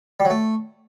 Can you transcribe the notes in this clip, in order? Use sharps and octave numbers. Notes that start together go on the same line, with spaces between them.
G3
F#3
A3